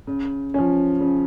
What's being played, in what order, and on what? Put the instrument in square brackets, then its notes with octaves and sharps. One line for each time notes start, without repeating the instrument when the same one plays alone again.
[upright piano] C#3
F3 C#4
C#3